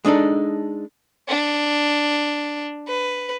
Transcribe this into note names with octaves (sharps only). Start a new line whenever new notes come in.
G#3 D4 D#4 A4
D4
B4